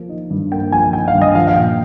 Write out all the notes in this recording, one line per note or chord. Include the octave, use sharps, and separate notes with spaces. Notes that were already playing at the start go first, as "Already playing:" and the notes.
Already playing: F3 A#3
D#4
G2
A#3 G5
F3 G#5
D#4 G5
F5
G2
D#5
F3 F5
F5
A#2 G5